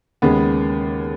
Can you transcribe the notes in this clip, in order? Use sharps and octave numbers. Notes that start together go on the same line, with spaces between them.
D#2 C#3 G#3 B3